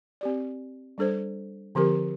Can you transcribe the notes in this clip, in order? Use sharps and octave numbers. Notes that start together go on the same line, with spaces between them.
C4 G4 D5
G3 D4 A4 C5
D3 F3 C4 G4 A#4